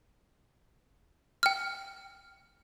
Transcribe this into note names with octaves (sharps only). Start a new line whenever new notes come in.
G5 F6